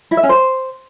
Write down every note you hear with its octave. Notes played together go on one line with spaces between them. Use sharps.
E4
E5
C#4
C5